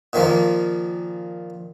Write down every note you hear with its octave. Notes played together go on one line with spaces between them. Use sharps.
A#2 D#3 F3 A#3